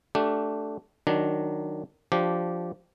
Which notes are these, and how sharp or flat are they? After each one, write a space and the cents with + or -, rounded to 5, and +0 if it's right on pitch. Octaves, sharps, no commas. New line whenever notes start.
A3 +0 D4 +0 G4 -25
D#3 -15 F#3 +0 D4 +0
F3 +0 D4 +0 G4 -10